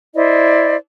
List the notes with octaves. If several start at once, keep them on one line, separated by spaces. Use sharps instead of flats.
E4 C5 D5 D#5